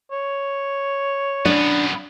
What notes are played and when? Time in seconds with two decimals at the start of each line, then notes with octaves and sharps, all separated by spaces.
0.11 C#5
1.45 F#2 B3 D4 D5